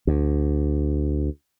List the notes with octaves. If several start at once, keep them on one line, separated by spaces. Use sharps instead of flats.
D2